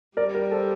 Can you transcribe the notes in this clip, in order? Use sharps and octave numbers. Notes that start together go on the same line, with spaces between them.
G3 A#4 D5
G4 A#4
A4 C5